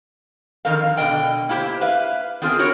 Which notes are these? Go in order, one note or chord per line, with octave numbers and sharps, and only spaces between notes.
F2 D#3 C4 A#4 F5
B2 D3 D#5 G5
A#3 E4 G4 C5
B4 E5 F5
B3 C4 F4 G#4 A#4
E4 F#4 A#4 C#5